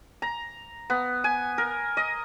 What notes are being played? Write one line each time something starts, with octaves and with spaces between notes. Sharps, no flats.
A#5
B3
G#5
A#4
D#5